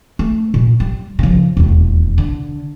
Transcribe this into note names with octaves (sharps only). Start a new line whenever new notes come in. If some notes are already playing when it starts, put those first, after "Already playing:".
A3
A#2
G3
C#3 F3
E1 D#2
D3